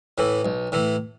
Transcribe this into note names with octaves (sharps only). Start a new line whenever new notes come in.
A2 E3
B1
A2 E3